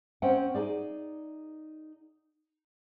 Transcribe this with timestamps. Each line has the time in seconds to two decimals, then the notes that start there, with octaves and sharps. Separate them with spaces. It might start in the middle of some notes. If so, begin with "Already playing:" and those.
0.22 C4 C#4 C5 F#5 G5
0.55 D#4 G#4 D5